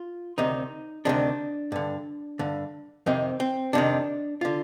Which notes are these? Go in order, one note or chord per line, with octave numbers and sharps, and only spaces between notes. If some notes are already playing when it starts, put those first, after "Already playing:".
Already playing: F4
D2 C3 D#3 D#4
D2 C3 D#3 D4
G2 D3
G2 D3
F2 C3 D#3 C4
C4
F2 C3 D#3 D4
D3 F4